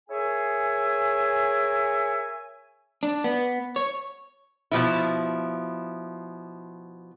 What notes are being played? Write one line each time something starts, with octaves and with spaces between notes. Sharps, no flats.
G#4 A#4 C#5 E5 G#5
D4
B3
C#5
B2 F3 E4